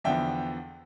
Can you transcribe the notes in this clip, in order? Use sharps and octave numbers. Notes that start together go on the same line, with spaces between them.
E2 D3 F3 B3 E5 G5